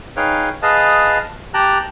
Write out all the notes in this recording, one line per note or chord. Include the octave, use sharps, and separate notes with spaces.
D#4 G#4 B4 C#5 F5 G5
G#4 B4 D#5 F5 A5
G4 G5 A5 A#5 F#6